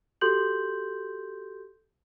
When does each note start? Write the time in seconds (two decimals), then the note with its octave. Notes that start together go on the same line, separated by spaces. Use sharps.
0.21 F#4 G4 A4 C6 G6 F#7